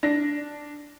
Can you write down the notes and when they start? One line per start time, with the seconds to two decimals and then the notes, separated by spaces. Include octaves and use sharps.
0.03 D4 A#6